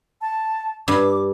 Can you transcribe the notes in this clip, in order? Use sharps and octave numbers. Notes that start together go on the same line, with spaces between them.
A5
G2 D6